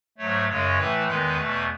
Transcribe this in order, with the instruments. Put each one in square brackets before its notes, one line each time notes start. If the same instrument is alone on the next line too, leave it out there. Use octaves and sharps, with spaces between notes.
[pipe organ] G#2 F#3 A3 C#5
F#2 C#3 G#3 C#5
A2 E3 A3 B4
E2 D#3 G#3 B4
E2 B2 A3